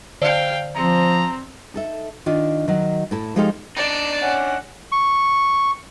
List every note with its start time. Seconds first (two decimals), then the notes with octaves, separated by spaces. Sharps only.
0.22 D3 C5 D5 F5 G5
0.75 F3 C4 A#5
1.74 D#4 A4 E5
2.26 D#3 D4 F4
2.68 D#3 F#3
3.11 A2 E4 A5
3.36 F3 G#3 D#4 G4 A4 F5
3.77 D4 D#4 D5 A5
4.22 C#4 F#5
4.92 C#6